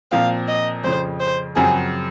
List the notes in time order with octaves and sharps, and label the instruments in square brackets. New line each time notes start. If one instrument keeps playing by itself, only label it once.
[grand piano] A#2 F3 C4 [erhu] F5
[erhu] D#5
[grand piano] F2 C#3 F3 [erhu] C5
[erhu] C5
[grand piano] F#2 C#3 F3 C4 F#4 [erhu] G#4